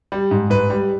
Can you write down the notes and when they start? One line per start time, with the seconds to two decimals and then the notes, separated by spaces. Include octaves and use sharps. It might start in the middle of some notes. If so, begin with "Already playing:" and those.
0.12 G3
0.31 G#2
0.50 G#2 B4
0.70 G3